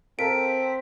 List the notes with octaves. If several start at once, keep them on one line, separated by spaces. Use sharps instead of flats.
C4 A4 A#4 F5 B6 D7